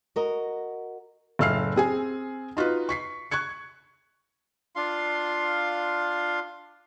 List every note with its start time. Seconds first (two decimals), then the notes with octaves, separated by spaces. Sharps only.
0.16 F#4 A#4 D#5
1.39 F#1 A2 F5 E6 F6 C7
1.76 C4 G#4 G#5
2.57 D#4 F4 F#4 B4
2.89 C#6 B6 C7
3.31 C#6 F#6 G#6 C#7
4.76 D4 F4 F5 C6